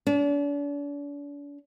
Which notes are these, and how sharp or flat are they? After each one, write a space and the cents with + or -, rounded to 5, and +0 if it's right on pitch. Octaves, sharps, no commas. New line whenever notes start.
D4 -40